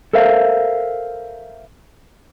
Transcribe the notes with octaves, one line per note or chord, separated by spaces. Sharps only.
A4 A#4 C5 E5 F5